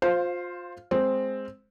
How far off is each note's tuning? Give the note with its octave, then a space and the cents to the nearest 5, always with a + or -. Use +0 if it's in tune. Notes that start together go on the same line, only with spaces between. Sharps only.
F4 +25 C5 +0 F5 +0
G#3 +0 C4 +0